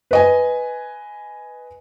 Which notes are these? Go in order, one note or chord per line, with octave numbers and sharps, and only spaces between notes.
B4 D#5 G#5